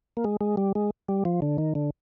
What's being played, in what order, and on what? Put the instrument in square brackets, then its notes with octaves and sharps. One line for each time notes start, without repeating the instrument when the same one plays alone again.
[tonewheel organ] A#3
G#3
G#3
G3
G#3
G3
F3
D3
D#3
D3